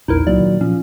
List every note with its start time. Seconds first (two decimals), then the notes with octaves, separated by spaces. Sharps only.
0.08 A#1 E2 D#4 E4 A#4
0.27 C#2 A#2 F#3 D5
0.40 D#3
0.61 A#2 F3 C#4